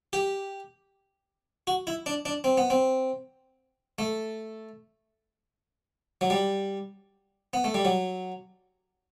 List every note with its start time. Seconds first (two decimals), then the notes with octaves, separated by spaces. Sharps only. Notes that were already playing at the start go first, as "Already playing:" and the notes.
0.13 G4
1.67 F#4
1.87 E4
2.06 D4
2.25 D4
2.44 C4
2.58 B3
2.70 C4
3.99 A3
6.21 F#3
6.30 G3
7.53 B3
7.64 A3
7.74 G3
7.85 F#3